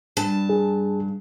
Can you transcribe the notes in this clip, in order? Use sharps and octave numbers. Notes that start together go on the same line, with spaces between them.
G2 A5
G#4